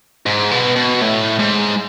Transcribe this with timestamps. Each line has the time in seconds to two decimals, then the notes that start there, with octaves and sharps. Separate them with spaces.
0.26 G#2
0.51 B2
0.76 B2
1.01 A2
1.39 G#2